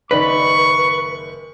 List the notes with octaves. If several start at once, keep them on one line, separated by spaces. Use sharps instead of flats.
F#1 D#3 B4 D5 C#6